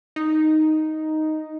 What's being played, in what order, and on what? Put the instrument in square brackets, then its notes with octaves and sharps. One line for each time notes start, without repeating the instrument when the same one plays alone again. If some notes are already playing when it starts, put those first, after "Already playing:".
[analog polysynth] D#4